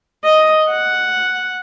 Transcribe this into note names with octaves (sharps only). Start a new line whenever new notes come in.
D#5
F#5